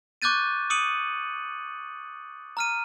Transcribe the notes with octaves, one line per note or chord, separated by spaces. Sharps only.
C#6 D6 F#6 G6 A6 D#7
D6 D#6 C#7 D#7 F#7
A#5 F6 D#7